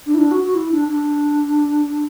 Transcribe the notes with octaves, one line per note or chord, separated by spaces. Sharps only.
D4
E4
D4
F#4
F#4
E4
D4
D4